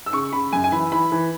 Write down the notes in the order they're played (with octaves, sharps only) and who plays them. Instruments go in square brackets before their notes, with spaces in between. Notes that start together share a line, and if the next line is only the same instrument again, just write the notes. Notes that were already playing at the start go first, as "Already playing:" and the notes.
[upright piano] E6
C#3 C#6
C#3 B5
F#2 G#5
G#5
E3 B5
E3 B5
E3